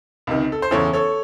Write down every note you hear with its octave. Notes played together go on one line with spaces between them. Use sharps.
C#2 C3 D#3
A4
C5
E2 C#3 E3 A4 C#5
A4 C#5